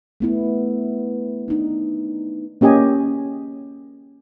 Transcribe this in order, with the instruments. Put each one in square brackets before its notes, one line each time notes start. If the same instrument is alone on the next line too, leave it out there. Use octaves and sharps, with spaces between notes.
[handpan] A3 B3 E4
D4 D#4
[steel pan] A#3 C#4 G4 D#5 G#5